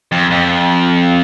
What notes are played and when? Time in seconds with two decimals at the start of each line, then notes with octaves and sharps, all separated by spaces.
0.12 F2
0.30 F2